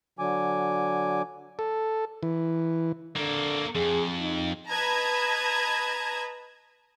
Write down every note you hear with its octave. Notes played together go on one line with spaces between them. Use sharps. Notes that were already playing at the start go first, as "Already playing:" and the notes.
D3 F#3 G#5 D6
A4
E3
D3 A#3 A4
F2 G#4
D#4
B4 D#5 A5 A#5 G#6